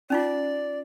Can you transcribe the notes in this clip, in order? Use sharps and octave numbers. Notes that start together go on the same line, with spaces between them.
C#4 D#4 F4 D5